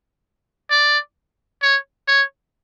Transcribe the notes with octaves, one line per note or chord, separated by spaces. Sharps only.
D5
C#5
C#5